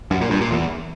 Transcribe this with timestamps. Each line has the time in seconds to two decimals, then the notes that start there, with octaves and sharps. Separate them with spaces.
0.11 F#2
0.21 A#2
0.31 G2
0.41 A#2
0.51 E2